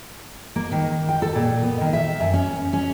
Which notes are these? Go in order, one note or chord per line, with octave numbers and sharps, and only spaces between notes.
A#3
D#3
G5
A4
A#2
B3
D#3
E5
F#2
C#4
C#4